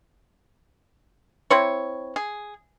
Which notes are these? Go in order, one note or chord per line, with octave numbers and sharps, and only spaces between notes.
C4 E4 C#5
G#4